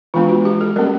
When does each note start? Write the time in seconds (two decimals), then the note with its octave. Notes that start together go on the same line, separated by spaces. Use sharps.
0.14 E3 G#3 B3 D4 F4
0.29 F#4
0.45 G4
0.61 A4
0.76 G3 A#3 C#4 A#4